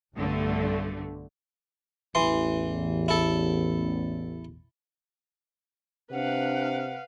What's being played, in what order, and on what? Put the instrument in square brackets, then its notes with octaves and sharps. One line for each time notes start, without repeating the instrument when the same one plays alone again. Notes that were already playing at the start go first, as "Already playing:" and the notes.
[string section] B1 G2 D3 A3
[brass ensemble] A1 E2 [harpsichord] E3 C6
[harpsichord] E4 A4
[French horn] C3 [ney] D4 [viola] B4 F5 [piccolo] F#5